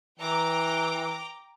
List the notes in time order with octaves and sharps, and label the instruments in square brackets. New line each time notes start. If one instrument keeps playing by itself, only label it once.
[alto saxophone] E3 [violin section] G5 A#5 D6